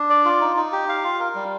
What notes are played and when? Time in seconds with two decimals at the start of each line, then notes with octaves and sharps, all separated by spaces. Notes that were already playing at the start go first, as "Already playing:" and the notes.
Already playing: D4
0.10 D5
0.25 F4
0.41 D#4
0.57 D#4
0.72 G4
0.89 F5
1.04 F4
1.19 A#4
1.35 G3